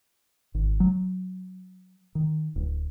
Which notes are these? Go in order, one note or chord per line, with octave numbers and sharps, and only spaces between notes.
G#1
F#3
D#3
D1